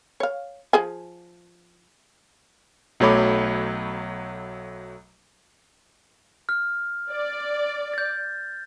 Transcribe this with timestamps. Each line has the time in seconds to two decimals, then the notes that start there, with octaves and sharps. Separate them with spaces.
0.20 C#5 F5
0.73 F3 G#4 G#5
3.00 B1 F#3 A3 C#5 B5 D6
6.49 F6
7.11 D5
7.93 G6 A6